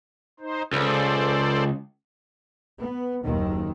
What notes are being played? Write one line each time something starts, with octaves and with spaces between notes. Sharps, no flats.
D#4 C5
C#2 A4 C5 D5
B3
F#1 D#2 D#3